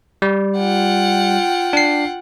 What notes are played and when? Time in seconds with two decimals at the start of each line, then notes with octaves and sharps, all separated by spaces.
0.22 G3
0.58 F4 F#5 G5
1.73 D4 C7